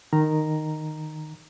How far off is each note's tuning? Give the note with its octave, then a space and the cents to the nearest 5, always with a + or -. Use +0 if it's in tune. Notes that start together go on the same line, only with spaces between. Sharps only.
D#3 -10 A#5 +0